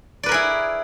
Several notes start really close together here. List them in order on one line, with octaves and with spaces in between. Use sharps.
D5 B4 A#4 G#4 E4